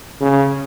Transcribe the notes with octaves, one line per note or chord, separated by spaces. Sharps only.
C#3